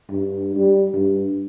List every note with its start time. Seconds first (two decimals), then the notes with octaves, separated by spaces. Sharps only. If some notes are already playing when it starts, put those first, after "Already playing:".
0.10 G2
0.56 G3
0.94 G2